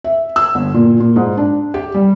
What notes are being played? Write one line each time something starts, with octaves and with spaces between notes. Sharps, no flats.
E5
E6
G1
A#2
A#2
G#2
D4
G4
G3